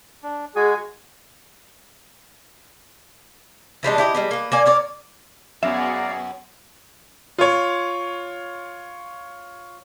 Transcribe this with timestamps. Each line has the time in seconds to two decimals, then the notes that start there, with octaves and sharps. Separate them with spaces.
0.23 D4
0.56 G#3 F#4 G#4 G#5
3.83 E3 G3 G#3 D4
3.98 E4 G4 D5 D#5
4.15 G3 G#3 B3
4.31 A#3 B3
4.52 A#3 D5 G#5
4.66 A#4 C#5 D5
5.63 F#2 B3 F#4 G#4 D5 E5 F5 A#5
7.38 F4 C#5